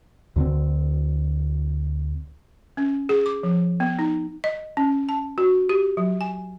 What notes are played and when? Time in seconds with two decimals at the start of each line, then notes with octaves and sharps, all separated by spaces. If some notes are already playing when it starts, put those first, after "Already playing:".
0.36 D2 D3 D#3 C4
2.77 C#4
3.09 G#4
3.26 D6
3.43 F3
3.80 B3
3.99 D#4
4.44 D#5
4.77 C#4
5.09 A5
5.38 F#4
5.69 G4
5.97 F#3
6.21 G#5